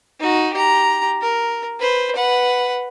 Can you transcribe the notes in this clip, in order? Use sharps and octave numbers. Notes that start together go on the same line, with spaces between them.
D#4 F#4
G4 A#5
A#4
B4 C5
B4 F#5